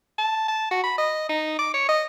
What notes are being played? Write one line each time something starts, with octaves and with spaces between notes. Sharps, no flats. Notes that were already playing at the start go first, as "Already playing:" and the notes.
A5
A5
F#4
B5
D#5
D#4
D6
C#5
D#5